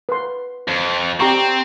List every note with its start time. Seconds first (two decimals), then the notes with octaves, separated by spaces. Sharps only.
0.09 B4 C6
0.68 F2
1.20 C4 G4 A#5 C#6